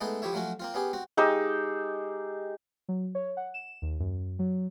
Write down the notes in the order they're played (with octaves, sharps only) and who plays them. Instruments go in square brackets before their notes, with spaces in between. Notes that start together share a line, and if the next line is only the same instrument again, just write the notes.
[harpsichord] G#3 A3 B3 D#4 G#4 A4
F3 E4 G4 C#5 E5
F3 F#3 A3 C#4 F#4
A#3 C4 F4
B3 C#4 G4 G#4
C4 F#4
[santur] G#3 D#4 G4 E6
[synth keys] F#3
C#5
F#5
E7
D#2
F#2
F#3